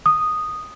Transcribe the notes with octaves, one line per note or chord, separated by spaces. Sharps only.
D#6